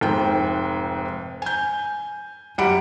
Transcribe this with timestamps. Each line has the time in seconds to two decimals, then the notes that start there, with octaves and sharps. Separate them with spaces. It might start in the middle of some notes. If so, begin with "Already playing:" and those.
0.01 F1 G#2 G5
1.42 G#5 G6
2.58 F#2 G3 G4 F#5 B5 D7